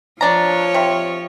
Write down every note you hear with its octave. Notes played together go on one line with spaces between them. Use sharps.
F3 D4 C#5 A#5
C3